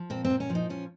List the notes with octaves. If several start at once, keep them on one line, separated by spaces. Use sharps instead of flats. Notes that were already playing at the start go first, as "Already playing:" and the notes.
Already playing: F3
A#2 C4
C4
A#2
C#4
F3
D#4
A#2 C#4